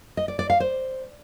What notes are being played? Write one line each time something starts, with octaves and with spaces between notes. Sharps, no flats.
D#5
D5
D5
F5
C5